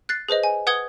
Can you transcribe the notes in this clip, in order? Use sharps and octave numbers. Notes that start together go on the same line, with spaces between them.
F#6 A6 C7
G#4 B4 C5 D#5
G#5
B4 F#5 D#6 G#6 G7